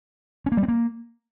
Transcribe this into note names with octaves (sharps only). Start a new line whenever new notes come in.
C#4
A#3
G3
C4
A#3